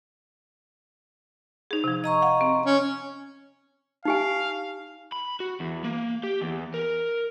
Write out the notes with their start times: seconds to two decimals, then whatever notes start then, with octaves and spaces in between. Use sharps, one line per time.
1.71 D#4 G#4
1.84 C3 F3
2.04 D#5 A#5 C#6 G#6
2.22 F5 F#5
2.41 C4
2.66 C#4
4.05 D#4 G4 F5 G#5
5.12 B5
5.40 F#4
5.60 E2
5.84 A#3
6.23 G4
6.40 E2
6.74 A#4